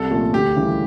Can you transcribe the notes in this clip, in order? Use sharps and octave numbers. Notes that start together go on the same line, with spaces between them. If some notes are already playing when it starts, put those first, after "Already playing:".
Already playing: C2 A4
A#2 F3 A3 C#4
D2 G4
C#3 E3 G3